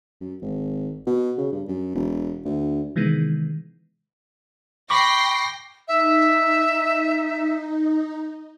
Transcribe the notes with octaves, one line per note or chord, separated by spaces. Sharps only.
F#2
G#1
B2
C#3
G2
F#2
E1
D2
C3 D#3 E3 G#3 B3
G5 B5 C#6 D6 A#6 C7
D#4 E5